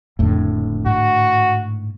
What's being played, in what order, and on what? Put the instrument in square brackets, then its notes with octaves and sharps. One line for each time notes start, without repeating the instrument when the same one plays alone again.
[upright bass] F#1 F2 [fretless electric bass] A2 D3
[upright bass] G#2 [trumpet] F#4